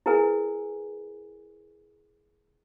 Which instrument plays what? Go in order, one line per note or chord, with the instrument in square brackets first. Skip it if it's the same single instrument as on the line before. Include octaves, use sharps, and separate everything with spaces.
[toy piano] E4 G#4 A#4 B4 G#5